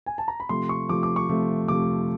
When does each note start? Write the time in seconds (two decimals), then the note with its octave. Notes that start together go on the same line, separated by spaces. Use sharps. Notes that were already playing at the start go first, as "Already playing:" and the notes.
0.06 G#5
0.18 A5
0.28 A#5
0.40 B5
0.49 C3 F3 A3 C6
0.69 C#6
0.89 C3 F3 A3 D6
1.03 D6
1.16 C#6
1.29 C3 F3 A3
1.68 C3 F3 A3 D6